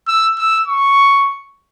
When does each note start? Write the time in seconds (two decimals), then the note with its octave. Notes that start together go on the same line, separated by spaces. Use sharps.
0.08 E6
0.38 E6
0.68 C#6